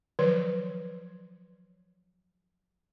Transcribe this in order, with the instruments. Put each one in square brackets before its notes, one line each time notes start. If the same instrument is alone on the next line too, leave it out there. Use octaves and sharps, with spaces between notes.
[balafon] D#3 F3 F#3 B4